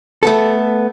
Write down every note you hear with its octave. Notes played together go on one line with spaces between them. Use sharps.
A3 B3 A4